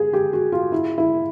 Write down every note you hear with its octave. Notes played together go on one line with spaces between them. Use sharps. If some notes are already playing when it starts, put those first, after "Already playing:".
Already playing: G#4
G4
F#4
F4
E4
E4